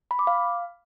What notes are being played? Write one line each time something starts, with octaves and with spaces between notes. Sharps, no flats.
B5
D6
F5